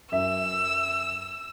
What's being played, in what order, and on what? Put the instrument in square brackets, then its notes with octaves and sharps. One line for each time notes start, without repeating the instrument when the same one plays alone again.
[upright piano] F#2 E5 [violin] E6